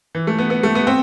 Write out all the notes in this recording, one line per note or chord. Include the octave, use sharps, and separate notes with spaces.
E3
A3
B3
B3
A3
B3
C4